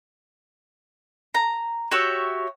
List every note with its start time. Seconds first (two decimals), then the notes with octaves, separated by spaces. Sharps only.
1.35 A#5
1.91 F#4 G4 C#5 E5